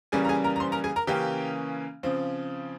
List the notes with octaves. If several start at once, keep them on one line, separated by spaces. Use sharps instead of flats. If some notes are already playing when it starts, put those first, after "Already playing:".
C#3 E3 G3 A#3 C#4 G#4 G#5
A#5
G#4 G#5
A#4 A#5
A#5
C5 C6
A#4 A#5
G#4 G#5
A#4 A#5
C#3 E3 A#3 C#4 G4 G5
C#3 F3 C4